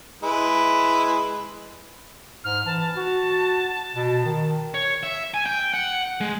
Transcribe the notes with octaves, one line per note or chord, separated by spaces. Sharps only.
G#3 E4 B4
G#2 F6
E3 A5
F#4
B2
D#3
C#5
E5
G#5
G5
F#5
G#3